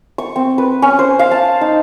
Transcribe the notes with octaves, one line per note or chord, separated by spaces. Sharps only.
C#6
C4
B4
C#4
C5
F5
A5
D#4